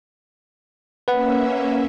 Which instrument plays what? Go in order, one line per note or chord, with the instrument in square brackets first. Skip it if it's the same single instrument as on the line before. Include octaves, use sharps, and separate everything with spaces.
[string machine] A#3 C#4 E5 [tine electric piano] B4 F#5